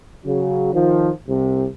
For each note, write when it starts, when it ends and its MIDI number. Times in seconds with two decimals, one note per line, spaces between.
0.25 0.71 49
0.25 0.71 54
0.73 1.09 51
0.73 1.09 53
1.28 1.66 36
1.28 1.66 48